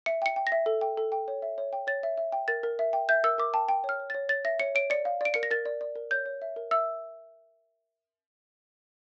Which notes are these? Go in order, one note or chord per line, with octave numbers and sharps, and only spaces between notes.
E5 C#7
G5 C#7
G5
A#6
E5
A4
G5
A4
G5
C#5
E5
C#5
G5
C#5 A6
E5
E5
G5
A#4 A6
A#4
E5
G5
E5 G6
A#4 E6
A#4 D6
G5 A5
G5
C#5
F6
C#5
C#5 A6
C#5 A6
E5 A#6
C#5 C#7
C#5 D7
D5 C#7
F5
D5 D7
A#4 C#7
A#6
A#4 A6
D5
D5
A#4
C#5 G6
C#5
E5
A#4
E5 E6